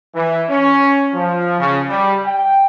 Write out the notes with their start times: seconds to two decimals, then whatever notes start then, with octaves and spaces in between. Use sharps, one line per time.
0.15 E3
0.49 C#4
1.13 F3
1.60 C#3
1.88 G3
2.25 G5